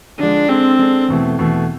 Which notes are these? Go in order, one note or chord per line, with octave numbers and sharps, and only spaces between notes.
D3 F3 G#3 D4
G#3 C4 D4 A4
G#3 D4 A4
E2 B2 A3 E4
E2 B2 A3 E4